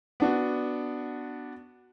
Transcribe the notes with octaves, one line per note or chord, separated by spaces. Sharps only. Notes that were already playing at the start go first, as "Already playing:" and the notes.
B3 D4 F#4